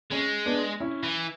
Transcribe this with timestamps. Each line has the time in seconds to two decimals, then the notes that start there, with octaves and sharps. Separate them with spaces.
0.11 G#3 C#4
0.46 B3 D4
0.80 C#4 E4
1.03 E3